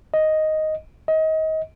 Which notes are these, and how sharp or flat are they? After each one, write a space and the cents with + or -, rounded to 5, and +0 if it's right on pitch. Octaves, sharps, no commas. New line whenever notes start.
D#5 +5
D#5 +30